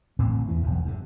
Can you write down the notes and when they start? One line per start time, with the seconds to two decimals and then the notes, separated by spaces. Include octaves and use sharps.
0.19 A1 A2 D3 C4
0.48 E2 E3
0.63 E1 B1 F2
0.85 G2 C3